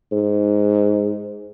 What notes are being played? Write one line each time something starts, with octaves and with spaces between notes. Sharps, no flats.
G#2